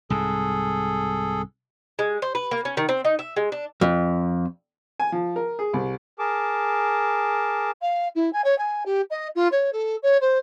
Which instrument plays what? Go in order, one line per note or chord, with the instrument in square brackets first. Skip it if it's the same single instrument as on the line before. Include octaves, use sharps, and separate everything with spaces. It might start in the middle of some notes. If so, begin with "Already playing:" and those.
[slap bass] C2 G#2 [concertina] G#4 A4
[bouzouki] G#3
C5
B4
A#3
C#4
D#3
C4
D#4
E5
G#3
D4
[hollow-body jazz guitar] F2
[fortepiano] G#5
F3
A#4
G#4
C2
[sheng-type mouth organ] G#4 A#4 A5 D6
[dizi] F5
E4
G#5
C#5
G#5
G4
D#5
F4
C#5
A4
C#5
C5